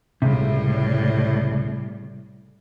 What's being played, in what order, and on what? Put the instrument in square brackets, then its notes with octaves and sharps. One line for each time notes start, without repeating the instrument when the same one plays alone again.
[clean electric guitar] C#2 C3 [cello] A2 G3